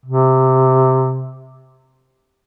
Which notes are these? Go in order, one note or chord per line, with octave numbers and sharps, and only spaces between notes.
C3